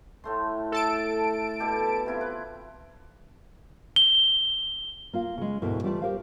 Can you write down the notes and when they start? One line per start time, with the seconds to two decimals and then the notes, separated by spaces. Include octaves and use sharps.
0.24 A2 A3 C6
0.72 A4 A5 D7
1.60 B2 G4
2.06 C3 E4 F4
2.21 B4
3.96 G7
5.13 A#3 F4 F5
5.38 C#3 G#3
5.62 D2 G#2 B2 E4 A#4
5.83 E3 G3 A3 F4 D5 A5
6.02 G4 A#4 C5 F5